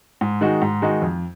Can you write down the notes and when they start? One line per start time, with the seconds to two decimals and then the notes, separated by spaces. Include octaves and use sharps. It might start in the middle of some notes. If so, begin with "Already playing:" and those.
0.21 G#2
0.41 D#3 G#3 D#4 F#4
0.62 G#2
0.82 D#3 G#3 D#4 F#4
1.02 F2